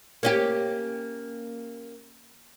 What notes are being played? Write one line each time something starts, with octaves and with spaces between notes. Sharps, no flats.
A#3 C#4 G4